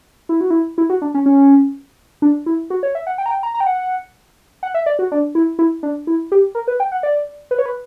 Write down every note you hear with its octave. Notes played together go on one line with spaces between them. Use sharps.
E4
F#4
E4
E4
F#4
D4
C#4
C#4
D4
E4
F#4
C#5
E5
F#5
G5
A#5
G5
A#5
A#5
G5
F#5
F#5
E5
D5
F#4
D4
E4
E4
D4
E4
G4
A#4
B4
G5
F#5
D5
B4
C#5
B4